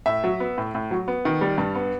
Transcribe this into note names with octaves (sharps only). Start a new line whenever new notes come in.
A2 E5
F#3
B3
A2
A2
F#3
B3
D#3
G3
G2
B3